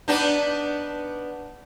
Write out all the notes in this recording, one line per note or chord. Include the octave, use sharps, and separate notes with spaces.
B3 D4 D#4